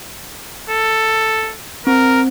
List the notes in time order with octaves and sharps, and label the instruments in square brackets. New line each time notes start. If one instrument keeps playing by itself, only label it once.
[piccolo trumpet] A4
[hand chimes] C4 [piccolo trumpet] A#4